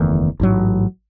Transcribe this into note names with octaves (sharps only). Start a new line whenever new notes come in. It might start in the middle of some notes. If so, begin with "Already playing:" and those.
Already playing: F#1 E2 D#3 A3
A1 G#2 F#3